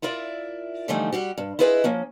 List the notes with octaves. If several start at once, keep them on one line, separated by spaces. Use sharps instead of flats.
E4 F4 A#4 D5 E5
D3 E3 F3 G3 A3 D#4
G3 F#4 G4
G2
E4 F4 G#4 B4 D5 D#5
F3 A#3 C#4